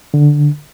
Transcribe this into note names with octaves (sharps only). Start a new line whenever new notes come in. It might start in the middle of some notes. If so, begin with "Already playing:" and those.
D3